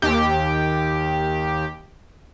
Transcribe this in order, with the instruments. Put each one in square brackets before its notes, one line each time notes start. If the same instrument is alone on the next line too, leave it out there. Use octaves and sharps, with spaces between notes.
[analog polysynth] D#2 G4